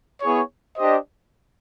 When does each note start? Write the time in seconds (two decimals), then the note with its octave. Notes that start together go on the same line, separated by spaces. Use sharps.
0.22 B3 E4 G#4 C#5
0.77 D4 G4 C5 D#5